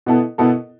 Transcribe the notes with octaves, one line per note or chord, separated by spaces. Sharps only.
B2 B3 E4 A4
B2 B3 E4 A4